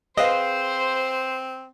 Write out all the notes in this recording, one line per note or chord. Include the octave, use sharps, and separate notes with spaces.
C4 G#4 B4 C5 D#5 F5